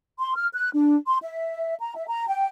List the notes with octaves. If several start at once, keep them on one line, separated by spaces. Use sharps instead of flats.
C6
F6
F#6
D4
C6
E5
A#5
E5
A#5
G5